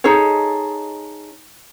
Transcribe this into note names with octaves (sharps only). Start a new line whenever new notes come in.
D#4 G#4 A4 C#5